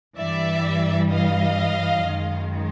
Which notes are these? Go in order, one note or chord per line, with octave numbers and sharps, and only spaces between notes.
G2 E3 G3 D5 E5
D#5 F5
F#2 D#3 G#3